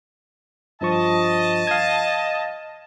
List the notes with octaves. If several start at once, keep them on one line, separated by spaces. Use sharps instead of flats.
G2 F3 D#5 A5 C#6
F5 G#6